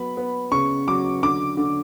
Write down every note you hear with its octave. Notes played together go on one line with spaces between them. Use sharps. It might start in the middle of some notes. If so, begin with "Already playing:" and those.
Already playing: F#3 B3 B5
B3
C#3 C#6
F#3 D6
D3 D6
D3